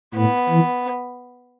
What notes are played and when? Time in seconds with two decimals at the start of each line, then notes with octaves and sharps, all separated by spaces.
0.15 A2 B3
0.49 E3